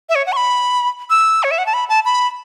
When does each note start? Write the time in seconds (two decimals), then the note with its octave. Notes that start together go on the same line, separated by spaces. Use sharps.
0.09 E5
0.15 C#5
0.26 F#5
0.32 C#6
0.37 B5
1.10 E6
1.43 C#5
1.51 E5
1.58 F#5
1.66 A5
1.74 B5
1.89 A5
2.05 B5